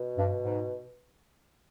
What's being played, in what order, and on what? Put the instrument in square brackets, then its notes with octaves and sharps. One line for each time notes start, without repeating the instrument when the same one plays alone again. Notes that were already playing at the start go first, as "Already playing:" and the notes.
Already playing: [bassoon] B2
[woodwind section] G2
G#2